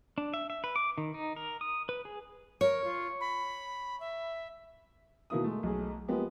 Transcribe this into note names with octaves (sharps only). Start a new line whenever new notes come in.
D4
E5
E5
B4
D6
D#3
D#4
A#4
D#6
B4
G#4
A#4 C#5
F4
B5
E5
B2 D#3 A#3 E4 D#6
G#3 A3
B1 A3 G#4
F3 G#3 A#3 B3 G4